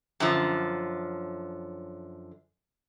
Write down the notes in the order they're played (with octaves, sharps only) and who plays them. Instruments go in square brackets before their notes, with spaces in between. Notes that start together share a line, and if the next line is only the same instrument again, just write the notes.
[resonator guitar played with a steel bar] F#2 D3 F3